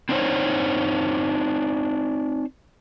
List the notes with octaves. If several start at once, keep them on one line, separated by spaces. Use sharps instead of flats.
C4 D4 D#4 A#4 C5 C#5